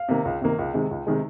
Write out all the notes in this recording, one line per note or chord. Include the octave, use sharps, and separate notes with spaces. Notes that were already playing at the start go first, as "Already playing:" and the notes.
Already playing: F5
C3 D#3 A#3
C#2
C3 D#3 A#3
C#2
C3 D#3 G#3
C#2
C3 D#3 G#3